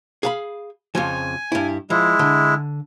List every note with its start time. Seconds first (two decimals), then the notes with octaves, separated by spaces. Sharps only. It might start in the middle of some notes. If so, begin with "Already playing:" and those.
0.23 G#4 F5 B5
0.95 F2 C#3 F3 G#5
1.52 G2 E4
1.90 F3 G#3 E4
2.19 D3